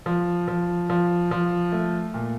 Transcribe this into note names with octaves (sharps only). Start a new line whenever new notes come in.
F3
F3
F3
F3
A3
A#2